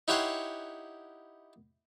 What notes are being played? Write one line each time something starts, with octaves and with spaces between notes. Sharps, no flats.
D#4 E4 G4 C#5 F#5 C6